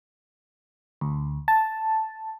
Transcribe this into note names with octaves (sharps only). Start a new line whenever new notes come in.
D2
A5